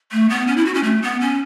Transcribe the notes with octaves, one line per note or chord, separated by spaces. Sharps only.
A3
B3
C#4
E4
F#4
C#4
A3
B3
C#4